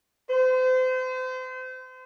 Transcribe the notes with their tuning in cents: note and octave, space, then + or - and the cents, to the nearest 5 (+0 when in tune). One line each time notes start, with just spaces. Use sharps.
C5 -35